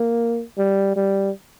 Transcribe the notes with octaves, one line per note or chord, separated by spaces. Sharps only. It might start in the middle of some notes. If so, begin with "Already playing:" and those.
Already playing: A#3
G3
G3